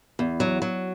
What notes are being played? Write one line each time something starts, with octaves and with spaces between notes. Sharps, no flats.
E2
F#3
F#3